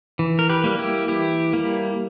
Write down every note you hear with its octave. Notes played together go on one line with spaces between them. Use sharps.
E3
A#4
G4 B4
G3 A#3
E4 G4
E3 E4 G4
G3 A#3